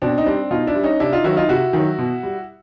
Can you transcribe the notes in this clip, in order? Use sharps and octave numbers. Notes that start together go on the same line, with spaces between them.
B2 C4 D4
D#4
G3 C4 D4
B2 D#4 F4
D4 E4
G3
C#4 D#4
C3 D4 E4
D#4 F4
D#3 F#3 E4 F#4
D#4 F4
C3 E4 F#4
D#3 F#3
B2
G3